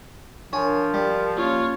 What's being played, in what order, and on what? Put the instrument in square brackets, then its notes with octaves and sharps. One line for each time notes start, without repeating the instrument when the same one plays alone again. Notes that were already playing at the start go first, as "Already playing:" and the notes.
[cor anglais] F3 [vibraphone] D4 A#4 [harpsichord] C#5 G#5
[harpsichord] G3 [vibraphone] A#4
[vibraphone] A#3 C#4 F5 [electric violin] F4 C#5